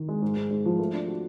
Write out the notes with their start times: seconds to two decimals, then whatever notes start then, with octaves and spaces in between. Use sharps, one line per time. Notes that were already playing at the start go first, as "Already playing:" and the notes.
Already playing: D#3
0.08 G#3
0.22 G#2
0.36 G#2
0.50 G#2
0.66 F3
0.79 A3
0.93 D4
1.08 F#4